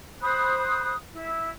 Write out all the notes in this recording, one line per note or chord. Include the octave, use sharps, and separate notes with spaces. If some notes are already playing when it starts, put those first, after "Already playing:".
C5 B5 D#6 F#6
E4